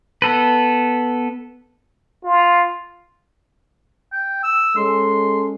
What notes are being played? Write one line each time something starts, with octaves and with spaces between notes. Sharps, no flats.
B3 A4 B4
F4
G5
E6
G#3 C#4 A4 C6